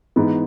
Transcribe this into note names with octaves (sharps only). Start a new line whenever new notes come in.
G#2 E3 B3